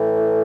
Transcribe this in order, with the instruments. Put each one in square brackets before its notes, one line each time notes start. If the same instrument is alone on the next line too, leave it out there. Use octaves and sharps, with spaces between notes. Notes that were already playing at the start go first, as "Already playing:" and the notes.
Already playing: [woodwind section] A2 E3